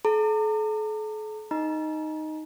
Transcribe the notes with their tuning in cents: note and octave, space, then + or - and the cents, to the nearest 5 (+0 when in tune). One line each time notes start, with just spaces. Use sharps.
A4 -45 A#5 -40
D#4 +0 D#5 +0 A#5 +30